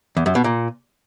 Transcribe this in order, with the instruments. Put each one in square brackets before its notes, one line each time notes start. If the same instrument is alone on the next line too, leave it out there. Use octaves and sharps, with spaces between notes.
[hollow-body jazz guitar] E2
F#2
B2
A#2